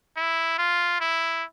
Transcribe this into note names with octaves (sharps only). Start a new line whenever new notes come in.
E4
F4
E4